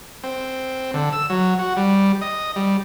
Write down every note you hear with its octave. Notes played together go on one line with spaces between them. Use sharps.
C4
D3
E6
F#3
F#4
G3
D#5
G3